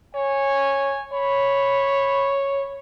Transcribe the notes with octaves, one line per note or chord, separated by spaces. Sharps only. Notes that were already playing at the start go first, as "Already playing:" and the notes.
C#5 G#5
C#5 B5